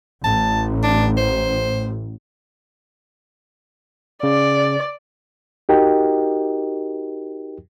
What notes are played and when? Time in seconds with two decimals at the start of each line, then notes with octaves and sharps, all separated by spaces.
0.24 A1 A5
0.83 D4
1.17 C5
4.23 C#3 D5
5.69 D#4 F#4 G4 A#4 D#5 G5